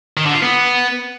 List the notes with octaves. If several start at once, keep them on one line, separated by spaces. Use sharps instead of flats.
D#3
D3
F4
B3